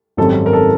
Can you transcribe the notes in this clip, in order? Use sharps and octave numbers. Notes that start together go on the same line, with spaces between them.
G#1 F#2 D#3 G3 C4 A4
A#4
A4